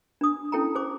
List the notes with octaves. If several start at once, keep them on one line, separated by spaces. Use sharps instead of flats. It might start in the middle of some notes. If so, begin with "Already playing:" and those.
D4 D#6
C#4 E4 A4 G5 A5 A#5
G#4 C5 D6